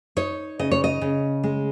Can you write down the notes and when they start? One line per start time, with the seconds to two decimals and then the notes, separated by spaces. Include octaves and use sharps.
0.17 D#4 C#5
0.59 C#3 D#5
0.71 C#5
0.84 D#5
1.01 C#3
1.43 G#3